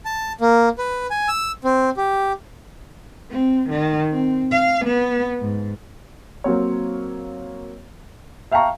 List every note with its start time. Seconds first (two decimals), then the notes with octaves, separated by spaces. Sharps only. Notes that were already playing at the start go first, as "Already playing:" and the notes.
0.05 A5
0.41 A#3
0.78 B4
1.11 G#5
1.28 E6
1.64 C4
1.97 G4
3.30 C4
3.69 D#3
4.11 C4
4.51 F5
4.85 B3
5.40 G#2
6.44 F#3 A#3 C4 C#5
8.51 E5 F5 G5 A5 A#5 C#6